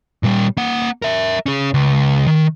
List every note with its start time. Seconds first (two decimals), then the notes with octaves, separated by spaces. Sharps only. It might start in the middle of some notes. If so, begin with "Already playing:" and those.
0.23 A#2 G3
0.57 A#3 F#5
1.02 A#4 E5
1.46 C#4 G#4
1.74 C#2
2.27 D#3